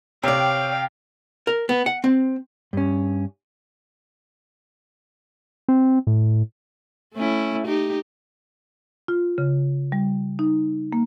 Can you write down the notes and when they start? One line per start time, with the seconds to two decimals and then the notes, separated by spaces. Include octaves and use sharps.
0.23 C3 C#5 D5 F5 G5
1.47 A#4
1.69 B3
1.86 F#5
2.04 C4
2.73 G2 C#4
5.68 C4
6.07 A2
7.16 A3 C#4 E4
7.67 D#4 G4
9.08 F4
9.38 C#3
9.92 G3
10.39 D#4
10.93 A#3